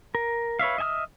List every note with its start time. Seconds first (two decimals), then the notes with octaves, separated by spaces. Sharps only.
0.15 A#4
0.59 B4 C#5 E5 F5
0.78 D#5 E5 G#5 D#6 F6